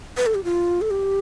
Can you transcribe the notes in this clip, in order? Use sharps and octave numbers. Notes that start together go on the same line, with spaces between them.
B4
A4
G4
F4
A4
G4